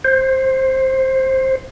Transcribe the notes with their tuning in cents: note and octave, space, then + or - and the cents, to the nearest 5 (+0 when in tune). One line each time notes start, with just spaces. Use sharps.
C5 +10